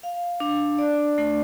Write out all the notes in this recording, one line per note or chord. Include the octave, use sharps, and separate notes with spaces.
F5
D4
D5
A3